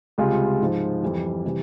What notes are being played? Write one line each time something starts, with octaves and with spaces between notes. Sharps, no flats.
C#2 C3 G3 F4 G#4
G#2 F3
F2 E3 G3
C3 E3 G3